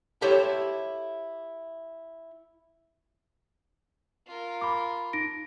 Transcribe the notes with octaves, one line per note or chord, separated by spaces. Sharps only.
E4 G4 A4 C5 C#5 E5
F4 A#4
B5 D6
D#4 A#6 D7